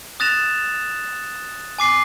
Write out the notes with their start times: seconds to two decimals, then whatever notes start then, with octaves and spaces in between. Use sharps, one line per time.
0.20 D#6 F#6 A6 A#6 E7 F7
1.79 G#5 D6 C7